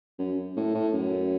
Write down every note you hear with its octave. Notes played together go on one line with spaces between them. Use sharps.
F#2
A2
A2
F#2